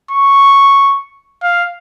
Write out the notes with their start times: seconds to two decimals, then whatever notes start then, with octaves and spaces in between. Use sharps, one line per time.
0.11 C#6
1.43 F5